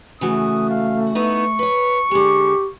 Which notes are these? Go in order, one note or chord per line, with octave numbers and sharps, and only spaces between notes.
C#3 E3 A3 F#4 D#6
F5
B3 D#4 E4 C#6
B4 C#5
D3 G#3 G4